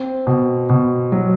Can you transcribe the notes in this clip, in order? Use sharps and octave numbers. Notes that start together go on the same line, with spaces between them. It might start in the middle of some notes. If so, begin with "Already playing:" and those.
Already playing: C4
B2
B2
F#3